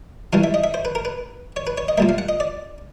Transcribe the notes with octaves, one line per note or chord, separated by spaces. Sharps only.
C#3 E3 G3 F5
E5
D#5
E5
C5
B4
A#4
B4
C#5
B4
C#5
D#5
A#2 G3 A#3 E5
F5
F#5
D#5
D5